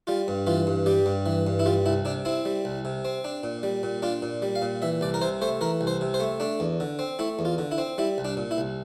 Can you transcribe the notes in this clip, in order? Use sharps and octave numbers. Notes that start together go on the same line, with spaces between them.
G3 F4
G2
E3 F4
G2
G3 G4
G2
E3
G2
E4
G3 F4
C2 E4
C3 D4
C4 E4
G3
C2
C3
C4
D4
A#2
G3
A#2
D4 F4
A#2
G3
F5
A#2
E3 E5
C2 D5
A#4
C3 C5
A3 C5
E3 A#4
C2
C5
C3
C5
A3
A3 D4
E2
D3
C4
A3 E4
E2
F4
D3
E4
C4
G3 E4
C2
D4
A#2
E4
C2